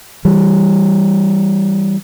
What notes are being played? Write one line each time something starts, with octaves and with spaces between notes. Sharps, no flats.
E3 G3